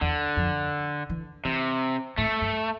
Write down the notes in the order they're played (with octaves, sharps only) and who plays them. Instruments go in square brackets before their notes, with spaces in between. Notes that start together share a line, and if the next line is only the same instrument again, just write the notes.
[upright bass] E2 [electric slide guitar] D3
[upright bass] F2
E3
[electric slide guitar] C3 [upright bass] E3
[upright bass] A2 [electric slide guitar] A3
[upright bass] G2